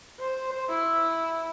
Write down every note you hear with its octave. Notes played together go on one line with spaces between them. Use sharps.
C5
E4